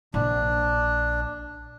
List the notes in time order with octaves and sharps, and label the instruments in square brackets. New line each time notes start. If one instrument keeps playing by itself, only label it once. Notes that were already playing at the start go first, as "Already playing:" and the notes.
[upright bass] A#1 [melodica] D4